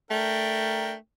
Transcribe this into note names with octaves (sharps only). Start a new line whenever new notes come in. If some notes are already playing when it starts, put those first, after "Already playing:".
A3 D4 A#4 G5